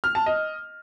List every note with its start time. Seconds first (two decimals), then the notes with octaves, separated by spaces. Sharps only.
0.04 F6
0.15 A5
0.26 D#5